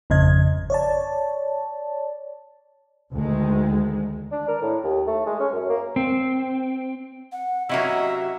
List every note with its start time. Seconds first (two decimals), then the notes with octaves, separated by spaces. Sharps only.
0.10 G#1 F2 C#3 D#5 G#6
0.70 C#5 D5 A5
3.13 D2 D#3 G#3
4.32 D4
4.48 A#4
4.62 A2
4.84 D#2
5.07 A3
5.26 G#3
5.40 C#4
5.53 F#2
5.70 A#3
5.96 C4
7.32 F#5
7.69 C3 F#3 A#3 C#4 E4 F#4 D#5 E5